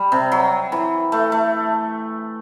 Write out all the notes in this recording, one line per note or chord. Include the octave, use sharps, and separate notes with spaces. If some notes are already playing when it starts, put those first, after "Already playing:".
Already playing: G3
C3
F#3
E3
A3
A3